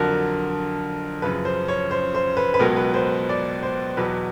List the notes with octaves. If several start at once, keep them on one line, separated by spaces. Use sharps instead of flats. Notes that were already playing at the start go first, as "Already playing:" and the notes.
Already playing: F2 D3 F#3 A#4
F#2 C#3 F3 B4
C5
C#5
C5
C5
B4
B4
C#2 B2 F#3 A#4
B4
C5
D5
C5
E2 B2 F#3 B4